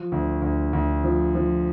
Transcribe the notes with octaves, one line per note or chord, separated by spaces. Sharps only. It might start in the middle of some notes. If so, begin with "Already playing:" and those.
Already playing: F3
D2
D2
D2
F3
F3